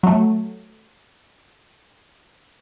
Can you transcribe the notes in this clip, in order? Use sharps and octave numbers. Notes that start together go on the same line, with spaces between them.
F#3 A3